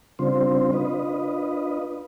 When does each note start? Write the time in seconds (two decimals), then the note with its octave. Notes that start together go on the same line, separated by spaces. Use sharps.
0.19 C#3 G3 C4 D4 F4 C5
0.73 D4 F4 B4 D#5